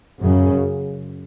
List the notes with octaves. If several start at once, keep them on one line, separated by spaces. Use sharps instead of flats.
F#2 C#3